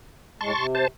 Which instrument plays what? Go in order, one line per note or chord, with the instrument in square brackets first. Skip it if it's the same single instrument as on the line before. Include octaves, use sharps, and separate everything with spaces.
[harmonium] A2 G#3 [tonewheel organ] A5 C6 C#6
[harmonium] C3
[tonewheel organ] C5 A5